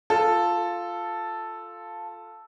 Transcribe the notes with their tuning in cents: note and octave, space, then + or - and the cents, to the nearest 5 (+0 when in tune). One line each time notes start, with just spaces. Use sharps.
F4 +0 A4 +0